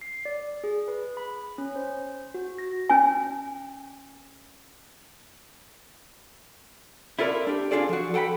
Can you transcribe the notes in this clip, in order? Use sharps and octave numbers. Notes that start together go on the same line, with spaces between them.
C7
D5
G#4
B4
B5
C#4
C5
F#4
A#6
C#4 G#5
E4 F4 A4 A#4 D5
D4 G4
D4 D#4 F4 G#4 A4 D5
F3 F#4
A4 F#5 G5 A#5 B5